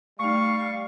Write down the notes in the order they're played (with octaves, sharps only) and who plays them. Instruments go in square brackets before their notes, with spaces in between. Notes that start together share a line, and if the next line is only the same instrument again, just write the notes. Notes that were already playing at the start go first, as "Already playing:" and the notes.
[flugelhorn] G3 [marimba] A3 D#4 [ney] F5 [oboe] C#6